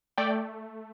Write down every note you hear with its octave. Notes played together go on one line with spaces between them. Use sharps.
A3 D5 G5